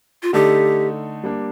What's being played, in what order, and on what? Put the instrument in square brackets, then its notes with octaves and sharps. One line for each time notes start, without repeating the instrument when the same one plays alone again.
[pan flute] F4
[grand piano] D3 A3 D#4 A4 [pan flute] G4
[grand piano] G3 A#3 D4